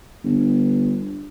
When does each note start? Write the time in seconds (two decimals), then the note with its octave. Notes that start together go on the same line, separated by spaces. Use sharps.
0.24 G1